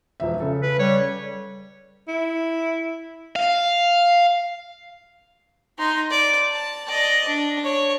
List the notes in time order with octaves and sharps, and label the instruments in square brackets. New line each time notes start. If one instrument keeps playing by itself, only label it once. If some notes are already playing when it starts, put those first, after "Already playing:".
[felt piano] E1 F3 E5
C#3 A4
[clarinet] B4
[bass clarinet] G3 [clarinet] C#5
[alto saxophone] E4
[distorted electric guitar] F5
[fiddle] D#4 C6
D5
A5
D5 D#5
D4
C#5